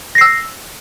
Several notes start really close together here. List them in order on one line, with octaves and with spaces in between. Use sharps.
A#6 C7 E6